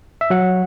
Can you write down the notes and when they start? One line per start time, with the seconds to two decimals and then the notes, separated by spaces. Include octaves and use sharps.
0.21 E5
0.30 F#3 F#5